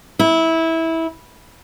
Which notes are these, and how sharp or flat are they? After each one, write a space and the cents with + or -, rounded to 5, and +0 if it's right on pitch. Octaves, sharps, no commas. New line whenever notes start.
E4 -15